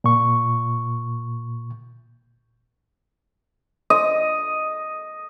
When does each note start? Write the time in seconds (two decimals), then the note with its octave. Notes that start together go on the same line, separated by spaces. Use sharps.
0.04 A#2 C#6
3.90 D#5